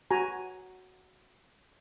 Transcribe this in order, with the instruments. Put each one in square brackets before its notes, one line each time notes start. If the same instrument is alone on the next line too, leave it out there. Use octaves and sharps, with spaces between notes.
[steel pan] F#4 G#5 A#5